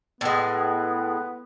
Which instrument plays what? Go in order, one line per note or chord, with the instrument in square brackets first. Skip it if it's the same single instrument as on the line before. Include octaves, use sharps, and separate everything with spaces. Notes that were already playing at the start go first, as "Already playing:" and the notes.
[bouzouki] A2 G#3 [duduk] B3